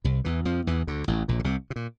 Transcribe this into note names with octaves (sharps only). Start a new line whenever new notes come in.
C2 C3
E2 E3
F2 F3
E2 E3
D2 D3
A1 A2
A#1 A#2
D3
C2 C3
C3
A#2